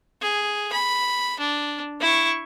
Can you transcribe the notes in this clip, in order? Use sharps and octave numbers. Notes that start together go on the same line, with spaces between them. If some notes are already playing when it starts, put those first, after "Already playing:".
G#4
B5
D4
E4 C#6